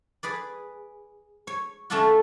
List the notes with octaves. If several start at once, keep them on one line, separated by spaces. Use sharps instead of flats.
G#4 B4 D5
C#5
D3 A3 C#4 D4 F4 F#4